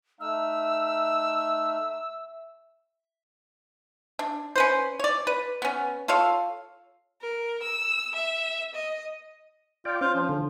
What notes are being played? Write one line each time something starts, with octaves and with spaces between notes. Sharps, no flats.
A3 D#4 E5 E6 F6
D4
C#4 B4 C5
C#5 D5
B4
B3 C#4
F4 A4 C#5 F5
A#4
E6
E5
D#5
F4 D5 G5
C#4 F4 C5
F3
D3